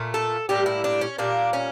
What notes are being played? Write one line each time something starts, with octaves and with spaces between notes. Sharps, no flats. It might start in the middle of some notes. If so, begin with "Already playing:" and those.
Already playing: A#2 A3
A4
A2 G3 A#3 G4
E4
D4
C#4
A#2 G3 A#3 D4
C#4